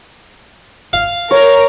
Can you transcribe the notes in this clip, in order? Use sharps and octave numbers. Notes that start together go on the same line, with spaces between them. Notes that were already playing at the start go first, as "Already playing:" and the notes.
F5
A#4 C#5